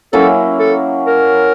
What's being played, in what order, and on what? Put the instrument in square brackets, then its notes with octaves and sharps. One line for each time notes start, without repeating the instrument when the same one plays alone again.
[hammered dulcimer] F#3 A#3 C#4 E4 [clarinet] A4
[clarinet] A4
A#4